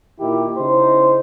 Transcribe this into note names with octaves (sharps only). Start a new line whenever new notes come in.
A#2 D#3 E4 G4
C#3 D#4 E4 C5